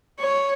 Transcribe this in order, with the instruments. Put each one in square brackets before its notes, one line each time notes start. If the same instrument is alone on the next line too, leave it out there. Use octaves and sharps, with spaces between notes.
[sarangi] C#5